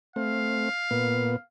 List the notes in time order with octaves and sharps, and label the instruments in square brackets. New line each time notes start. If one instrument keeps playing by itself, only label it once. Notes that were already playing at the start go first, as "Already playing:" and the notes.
[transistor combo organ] A3 C4 [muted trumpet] F5
[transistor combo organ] A#2 B3